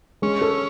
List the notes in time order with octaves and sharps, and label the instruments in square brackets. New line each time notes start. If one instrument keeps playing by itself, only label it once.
[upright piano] G#3 [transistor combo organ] C#4
[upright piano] A4